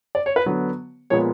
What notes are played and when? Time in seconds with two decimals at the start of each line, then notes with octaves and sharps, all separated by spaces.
0.15 D5
0.26 C#5
0.36 B4
0.46 D3 F#3 B3
1.10 A#2 F3 G#3 B3 C#5